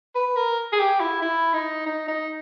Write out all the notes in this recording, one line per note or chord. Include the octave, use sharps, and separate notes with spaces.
B4
A#4
G#4
G4
E4
E4
D#4
D#4
D#4